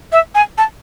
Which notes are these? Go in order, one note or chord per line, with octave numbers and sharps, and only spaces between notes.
E5
G#5
A5